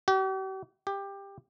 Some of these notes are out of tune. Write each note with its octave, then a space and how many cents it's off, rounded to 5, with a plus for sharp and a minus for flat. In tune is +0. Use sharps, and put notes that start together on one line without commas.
G4 -45
G4 +15